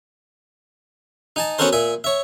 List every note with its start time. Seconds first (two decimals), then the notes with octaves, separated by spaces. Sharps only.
1.36 D#4 G#5 A5
1.59 B3 C#4 F#4 A4 A#4 C5
1.73 A#2 E5 G#5
2.04 C#5 E5